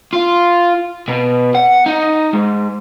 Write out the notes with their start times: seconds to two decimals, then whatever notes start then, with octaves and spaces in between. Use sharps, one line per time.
0.13 F4
1.08 B2
1.55 F#5
1.86 D#4
2.34 G#2